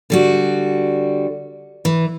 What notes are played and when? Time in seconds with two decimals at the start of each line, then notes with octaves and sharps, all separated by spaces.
0.10 D3 G3 F#4
1.85 E3